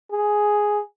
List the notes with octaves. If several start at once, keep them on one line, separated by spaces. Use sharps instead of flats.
G#4